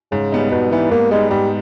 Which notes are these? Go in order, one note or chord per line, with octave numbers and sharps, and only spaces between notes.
G#2 C#3
G3 B3 D#4
G#2 B2
E3 G3 B3 D#4
G#2 A#3
G3 G#3 B3 D#4
G#2 G3